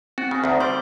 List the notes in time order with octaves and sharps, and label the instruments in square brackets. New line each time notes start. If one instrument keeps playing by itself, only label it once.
[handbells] C4 [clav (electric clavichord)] F#4
[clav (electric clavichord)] C#3
D2 D#3
[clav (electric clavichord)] G3 [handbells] C5 C6 G6